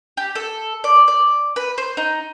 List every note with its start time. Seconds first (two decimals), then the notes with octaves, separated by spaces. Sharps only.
0.17 G4
0.35 A4
0.84 D5
1.08 D5
1.56 B4
1.78 C5
1.97 D#4